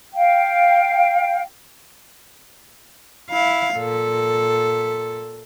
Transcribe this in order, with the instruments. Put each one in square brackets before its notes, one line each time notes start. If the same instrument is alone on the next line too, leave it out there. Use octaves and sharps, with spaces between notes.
[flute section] F5 G5
[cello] E4 F5
A#2 A4